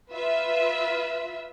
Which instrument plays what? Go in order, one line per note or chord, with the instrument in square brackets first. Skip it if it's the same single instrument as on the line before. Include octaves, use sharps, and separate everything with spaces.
[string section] F4 B4 E5